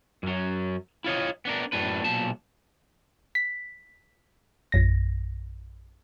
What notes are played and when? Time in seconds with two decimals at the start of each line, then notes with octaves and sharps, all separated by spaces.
0.23 F#2 F#3
1.04 E4 F4 C#5 D#5
1.45 B3 D4 A#4
1.72 F#2 A2 D4 B4
2.04 B1 A#2 A5
3.35 B6
4.72 A#1 F#2 A#6